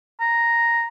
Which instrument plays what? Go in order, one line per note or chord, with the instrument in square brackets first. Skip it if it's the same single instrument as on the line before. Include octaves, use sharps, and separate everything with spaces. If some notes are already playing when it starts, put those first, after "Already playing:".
[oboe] A#5